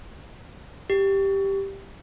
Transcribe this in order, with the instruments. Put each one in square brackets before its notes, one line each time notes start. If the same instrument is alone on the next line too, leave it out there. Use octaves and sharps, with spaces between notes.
[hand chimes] G4